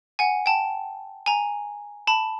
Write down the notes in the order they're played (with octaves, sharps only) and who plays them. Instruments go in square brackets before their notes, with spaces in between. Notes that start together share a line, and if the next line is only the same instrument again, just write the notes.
[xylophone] F#5 G#5
G5 A5
G#5 A#5
A5 B5